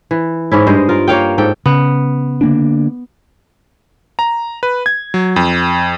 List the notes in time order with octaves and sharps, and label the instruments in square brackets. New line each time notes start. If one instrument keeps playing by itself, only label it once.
[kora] E3
G#2 C#4 E4
G2 G#3 C5 D#5
F4 A#4
A#3 C#5 F5 G5
G#2 A4 G5
[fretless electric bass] C#3 [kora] B3
[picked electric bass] D3 A#3 D4
[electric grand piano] A#5
B4
G#6
F#3
F2